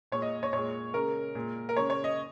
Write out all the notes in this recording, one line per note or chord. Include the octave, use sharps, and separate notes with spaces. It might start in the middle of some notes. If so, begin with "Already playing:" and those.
A#2 G#3 C#5
D#5
C#5
A#2 G#3 C#5
C#3 G#3 A#4
A#2 G#3
A#4
C#3 G#3 C#5
C#5
D#5